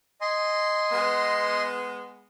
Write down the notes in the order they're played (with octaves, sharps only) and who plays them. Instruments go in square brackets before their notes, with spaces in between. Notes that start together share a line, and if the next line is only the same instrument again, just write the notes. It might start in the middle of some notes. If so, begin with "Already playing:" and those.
[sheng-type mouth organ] D#5 G#5 C6
[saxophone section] G#3 B3